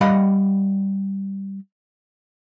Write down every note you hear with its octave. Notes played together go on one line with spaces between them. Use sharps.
G3 D#5 F5 F#5 B5